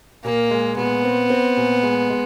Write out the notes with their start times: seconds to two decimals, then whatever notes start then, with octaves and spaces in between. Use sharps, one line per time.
0.24 A#2 A#3
0.51 G#3
0.77 A#2 B3
1.04 C4
1.30 C4
1.57 A#2
1.83 G#3
2.10 G#3